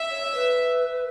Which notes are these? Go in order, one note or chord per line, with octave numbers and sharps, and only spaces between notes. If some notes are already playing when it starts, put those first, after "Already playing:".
Already playing: E5
C#5
B4